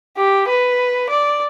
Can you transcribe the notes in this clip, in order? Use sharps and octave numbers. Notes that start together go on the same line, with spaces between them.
G4
B4
D5